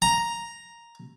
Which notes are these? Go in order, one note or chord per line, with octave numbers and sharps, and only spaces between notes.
A#5